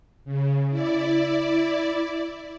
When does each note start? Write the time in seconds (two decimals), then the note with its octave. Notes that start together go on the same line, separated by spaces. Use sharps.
0.25 C#3
0.70 E4 D5